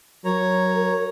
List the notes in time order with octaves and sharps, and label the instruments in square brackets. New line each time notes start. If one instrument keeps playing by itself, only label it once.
[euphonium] F#3 [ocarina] A#4 [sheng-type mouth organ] C#5 A#5